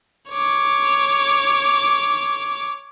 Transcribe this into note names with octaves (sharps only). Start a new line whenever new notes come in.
C#5 D6